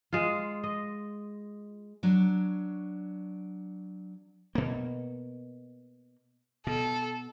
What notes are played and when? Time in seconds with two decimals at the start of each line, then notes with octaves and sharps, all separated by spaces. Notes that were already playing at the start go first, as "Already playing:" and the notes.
0.13 G#3 F4
0.64 D#5
2.03 F#3 D4 C#5
4.55 B2 A#3
6.67 B2 A4